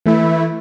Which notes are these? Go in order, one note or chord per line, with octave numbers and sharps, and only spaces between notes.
E3 A3 E4